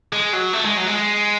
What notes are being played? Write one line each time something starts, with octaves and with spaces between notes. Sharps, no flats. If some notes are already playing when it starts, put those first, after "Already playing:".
G#3
F#3
A3
G#3
F#3
G#3